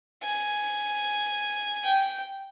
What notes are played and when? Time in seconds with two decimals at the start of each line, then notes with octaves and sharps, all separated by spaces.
0.23 G#5
1.84 G5